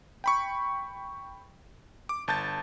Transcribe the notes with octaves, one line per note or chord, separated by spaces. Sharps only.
G5 B5 C#6
D6
G1 A5 G6 A6